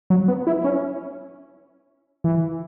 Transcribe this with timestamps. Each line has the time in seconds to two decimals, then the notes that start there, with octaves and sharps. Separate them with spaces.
0.10 F#3
0.28 B3
0.47 E4
0.64 C#4
2.24 E3